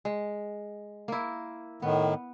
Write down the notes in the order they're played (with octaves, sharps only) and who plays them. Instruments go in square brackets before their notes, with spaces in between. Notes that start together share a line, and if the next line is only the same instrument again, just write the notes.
[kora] G#3
A#3 E4
[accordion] A2 D#3 [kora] B3